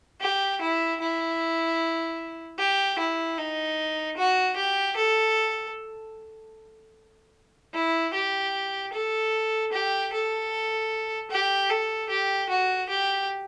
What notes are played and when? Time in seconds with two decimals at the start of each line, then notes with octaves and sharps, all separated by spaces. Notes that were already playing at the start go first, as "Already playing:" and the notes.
0.21 G4
0.61 E4
1.00 E4
2.58 G4
2.99 E4
3.38 D#4
4.17 F#4
4.56 G4
4.97 A4
7.74 E4
8.13 G4
8.93 A4
9.72 G4
10.12 A4
11.31 G4
11.70 A4
12.10 G4
12.49 F#4
12.89 G4